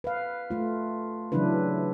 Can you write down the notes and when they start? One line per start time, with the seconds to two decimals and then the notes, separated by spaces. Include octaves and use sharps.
0.04 B4 F5
0.50 A3 F4
1.32 C#3 E3 F#3 D4 E4 B4